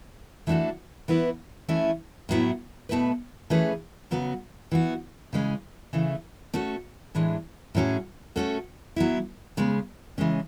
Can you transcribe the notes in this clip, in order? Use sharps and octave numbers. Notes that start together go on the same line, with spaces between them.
E3 A3 D4 F#4 A4
E3 B3 E4 B4
E3 A3 C#4 E4
A2 F#3 B3 E4
B2 A3 E4 B4
E3 A3 C#4 G#4 B4
C#3 F#3 B3 F#4
E3 B3 F#4
C#3 E3 G#3 C#4
C#3 E3 A3
A3 C#4 F#4 A4
A2 E3 G#3 D4
A2 F#3 C#4 G#4
A3 C#4 F#4 A4
F#3 B3 E4
C#3 G#3 B3
C#3 E3 G#3 C#4